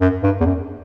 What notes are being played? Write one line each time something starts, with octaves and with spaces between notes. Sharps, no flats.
F#2
G2
E2
F#2